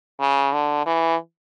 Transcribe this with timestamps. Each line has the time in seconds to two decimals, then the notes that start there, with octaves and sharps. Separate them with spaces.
0.20 C#3
0.53 D3
0.86 E3